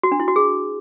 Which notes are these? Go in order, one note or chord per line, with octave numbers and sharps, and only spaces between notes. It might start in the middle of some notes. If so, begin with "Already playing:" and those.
F#4
D4
E4
F#4
G#4